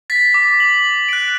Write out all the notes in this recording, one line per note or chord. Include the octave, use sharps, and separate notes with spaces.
A6 B6
D6
F#7
F#6 D7